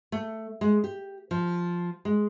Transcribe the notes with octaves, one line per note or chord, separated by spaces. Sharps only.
A3
G#3
G4
F3
G#3